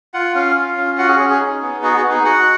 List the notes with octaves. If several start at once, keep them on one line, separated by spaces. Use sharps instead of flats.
F4 F#5
C#4 F5
F4
C#4
F#4 F#5
G#4
C#4 G#4
G#4
D#4
B3
F#4 G#4
F#4
D#4
G#4
F#4 F#5